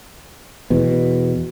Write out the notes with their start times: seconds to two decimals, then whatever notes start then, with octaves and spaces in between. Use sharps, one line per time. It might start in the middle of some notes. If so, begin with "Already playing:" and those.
0.70 E2 B2